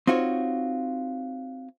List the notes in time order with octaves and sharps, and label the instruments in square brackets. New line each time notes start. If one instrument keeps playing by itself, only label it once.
[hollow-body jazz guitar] C4 D#4 F4 F#4 C#5